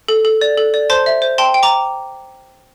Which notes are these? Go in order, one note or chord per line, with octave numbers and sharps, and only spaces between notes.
A4
A4
D5
A4
D5
C5 A5 C6
E5
C5
G5 A5 C6
G5
A#5 D6